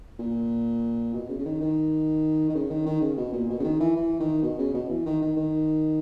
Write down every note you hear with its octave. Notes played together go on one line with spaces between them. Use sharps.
A#2
B2
C#3
C#3
D#3
D#3
D#3
C#3
D#3
D#3
C#3
B2
A#2
B2
C#3
D#3
E3
E3
D#3
B2
C#3
B2
E3
D#3
D#3
D#3